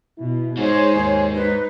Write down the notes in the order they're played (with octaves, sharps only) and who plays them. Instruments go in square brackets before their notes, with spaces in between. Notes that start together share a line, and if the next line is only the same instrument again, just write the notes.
[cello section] B2 [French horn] E4
[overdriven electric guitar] G#2 G#3 [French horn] D#4 [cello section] G#4 C5 C#5
[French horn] D#2 [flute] G#5
[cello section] D#4 [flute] B4